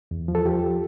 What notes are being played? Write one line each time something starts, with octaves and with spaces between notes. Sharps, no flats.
E2
F3
A4
F3 G4